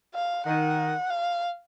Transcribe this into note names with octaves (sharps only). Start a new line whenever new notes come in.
F5
D#3 F#5
F5